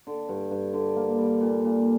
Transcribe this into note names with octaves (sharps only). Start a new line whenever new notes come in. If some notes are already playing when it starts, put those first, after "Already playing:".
D3
G2
G2
D3
A#3
G3
A#2
A#2